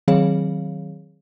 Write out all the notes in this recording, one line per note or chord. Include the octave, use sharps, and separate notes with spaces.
D#3 F#3 C4 G#4 C#5 F5